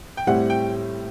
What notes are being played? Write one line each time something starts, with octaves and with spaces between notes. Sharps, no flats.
G5
A2 G3 C4 E4 F#5
G5